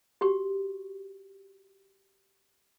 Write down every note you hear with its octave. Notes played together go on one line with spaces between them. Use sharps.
F#4 G4 C#6